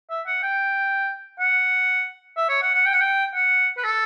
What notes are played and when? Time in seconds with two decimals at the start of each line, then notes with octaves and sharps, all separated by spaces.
0.10 E5
0.27 F#5
0.43 G5
1.40 F#5
2.37 E5
2.49 C#5
2.62 F#5
2.74 F#5
2.86 G5
2.93 F#5
3.01 G5
3.35 F#5
3.77 B4
3.84 A4